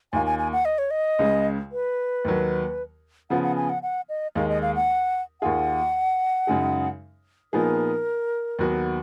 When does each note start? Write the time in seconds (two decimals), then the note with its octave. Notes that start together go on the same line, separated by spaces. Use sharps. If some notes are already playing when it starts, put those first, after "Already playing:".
0.13 D#2 D#3 A#3 F4 G#5
0.26 G#5
0.39 G#5
0.53 F#5
0.65 D#5
0.78 C#5
0.91 D#5
1.19 C#2 C#3 G#3
1.72 B4
2.25 D#2 D#3 F#3
3.30 C#3 F3 B3 F#5
3.43 F#5
3.57 G#5
3.69 F#5
3.83 F#5
4.09 D#5
4.35 D#2 D#3 G#3 D#4 F5
4.49 D#5
4.62 F5
4.76 F#5
5.41 D#2 D#3 A#3 F4 G#4 F#5
6.47 F#2 C#3 G#3 D#4 G#4
7.53 A#2 F3 B3 D#4 G#4 A#4
8.59 D#2 D#3 F#3 B3 F#4